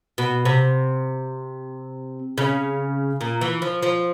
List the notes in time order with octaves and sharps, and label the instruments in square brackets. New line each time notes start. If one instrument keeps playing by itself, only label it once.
[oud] B2
C3
C#3
A#2
E3
F3
F3